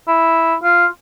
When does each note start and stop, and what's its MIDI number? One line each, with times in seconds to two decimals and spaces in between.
0.08 0.55 64
0.63 0.86 65